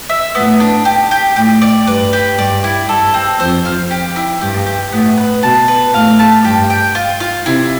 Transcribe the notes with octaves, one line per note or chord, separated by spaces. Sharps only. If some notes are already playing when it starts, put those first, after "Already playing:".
E5
A2 B3
D4
G4
G4
A2 G4
D5
G2 B4
G4
G2 D5
E4
G2 A4
C4
F2 C5
F5
G4
E4
G2 G4
G4
A2 B3
B4
B2 A5
B4
A2 F5
A5
G2 G4
G5
F4
F4
C3 E4